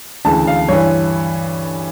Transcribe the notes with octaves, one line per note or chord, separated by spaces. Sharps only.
D2 C#3 E3 A5
F5
G2 E3 C#5